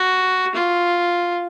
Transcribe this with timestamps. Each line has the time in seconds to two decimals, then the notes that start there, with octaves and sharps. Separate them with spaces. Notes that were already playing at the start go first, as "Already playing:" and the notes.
Already playing: F#4
0.55 F4